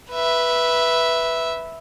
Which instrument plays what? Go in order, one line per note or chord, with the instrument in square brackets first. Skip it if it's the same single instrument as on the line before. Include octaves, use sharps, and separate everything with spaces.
[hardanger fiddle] B4 E5